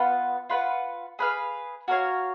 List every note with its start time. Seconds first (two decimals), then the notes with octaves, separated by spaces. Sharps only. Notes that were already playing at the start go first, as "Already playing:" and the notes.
Already playing: B3 F4 B4 F#5
0.50 F4 B4 F#5
1.19 G#4 B4 F5
1.88 F#4 A#4 C#5 F5